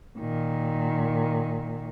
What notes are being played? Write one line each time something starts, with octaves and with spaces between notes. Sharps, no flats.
A#2 D#3